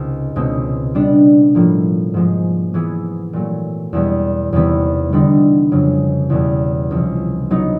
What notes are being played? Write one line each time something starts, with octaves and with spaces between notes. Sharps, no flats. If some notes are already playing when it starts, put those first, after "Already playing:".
Already playing: C#2 C3 D#3
C#2 B2 G#3 C4
G3 B3 D4
A2 F3 A#3
G#2 F3 G#3
E3 G#3 B3 E4 G#4
A#2 F#3 A3
E2 B2 G3
E2 C3 D#3 G3 B3
D3 G3 B3 D#4
F2 C#3 F#3
E2 B2 G3
C#2 C3 F3
F#3 B3 D#4